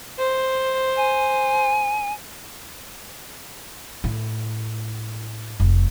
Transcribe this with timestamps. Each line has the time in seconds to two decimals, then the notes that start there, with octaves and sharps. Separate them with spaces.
0.18 C5
0.96 G#5
4.04 A2
5.60 F1